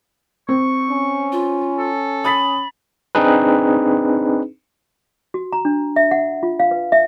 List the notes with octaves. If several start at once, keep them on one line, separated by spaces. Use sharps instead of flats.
C4 C#6
C#4
F4
A4
B5 D#6 A6 B6
C4 D4 D#4 G#4 B4
F#4
A#5
D4
E5
F#5
F4
F5
B4
E5